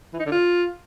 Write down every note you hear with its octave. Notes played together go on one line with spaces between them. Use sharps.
E3
D#4
D3
F4